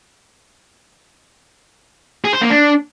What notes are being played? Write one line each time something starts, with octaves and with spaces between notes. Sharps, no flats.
G#4
C5
A#3
D4